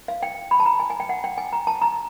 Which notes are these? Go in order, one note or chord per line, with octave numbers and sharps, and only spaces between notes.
F5
G5
B5
A5
A#5
G#5
G#5
G5
F#5
G5
G#5
A#5
A5
A#5